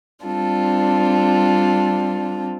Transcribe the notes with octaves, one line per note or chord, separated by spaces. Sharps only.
G3 C4 D4 F4 A4